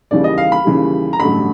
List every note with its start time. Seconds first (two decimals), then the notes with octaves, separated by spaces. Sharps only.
0.11 D#2 C#3 E3 G3 D5
0.24 D#5
0.38 F5
0.52 B5
0.65 D#2 C#3 E3 G3
1.13 A#5
1.19 A1 G2 D3 F#3 A3 B5